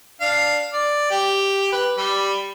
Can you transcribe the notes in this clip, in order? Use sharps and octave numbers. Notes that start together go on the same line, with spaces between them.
D4 F5
D5
G4
B4
G3 B5